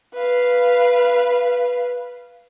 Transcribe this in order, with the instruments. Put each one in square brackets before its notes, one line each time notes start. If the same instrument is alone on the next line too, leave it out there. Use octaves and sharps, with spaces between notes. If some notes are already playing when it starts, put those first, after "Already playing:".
[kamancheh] B4 F5